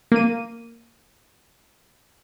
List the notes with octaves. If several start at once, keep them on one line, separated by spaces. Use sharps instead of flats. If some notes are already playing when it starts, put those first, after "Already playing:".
A#3 D#7